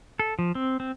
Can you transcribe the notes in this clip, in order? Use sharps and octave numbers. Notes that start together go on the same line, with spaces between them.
A4
F3
C4
C4